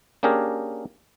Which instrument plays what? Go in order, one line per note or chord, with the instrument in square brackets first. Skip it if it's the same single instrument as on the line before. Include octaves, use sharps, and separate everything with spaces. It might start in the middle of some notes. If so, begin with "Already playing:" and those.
[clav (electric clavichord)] A#3 C#4 D4 G4 G#4 A#4